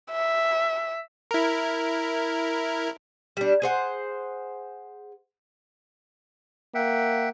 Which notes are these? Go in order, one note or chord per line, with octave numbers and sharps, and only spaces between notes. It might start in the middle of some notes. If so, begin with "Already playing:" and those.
E5
E4 A#4
G3 D4
G#4 C5 F#5
A#3 E5 F#5 G5